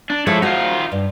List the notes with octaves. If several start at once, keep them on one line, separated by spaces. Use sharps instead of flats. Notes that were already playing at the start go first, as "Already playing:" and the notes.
D4
F3 G#3 E4 A4 C#5
D#4 F4 F#4 C5
G2